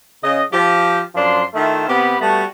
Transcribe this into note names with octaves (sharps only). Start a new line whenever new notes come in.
C#3 D#5
F3 G4
F#2 F3 D4 C6
D#3 A3 E4 F4
C3 B3 G4 B5
G3 A3 B3 F#4 A5